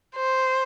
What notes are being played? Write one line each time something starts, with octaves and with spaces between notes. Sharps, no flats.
C5